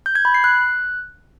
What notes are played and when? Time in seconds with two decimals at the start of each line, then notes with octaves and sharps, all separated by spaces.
0.06 G6
0.15 G#6
0.25 B5
0.34 C7
0.44 F#6